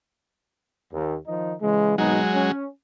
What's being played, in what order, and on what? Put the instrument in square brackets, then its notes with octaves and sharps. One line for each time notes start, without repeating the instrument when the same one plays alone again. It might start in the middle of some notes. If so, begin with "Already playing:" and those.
[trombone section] D#2
D#3 F3 D#4
C#3 E3 G#3
[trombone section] G#1 B2 D#4 [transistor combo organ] F#3 G#3
[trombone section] C#4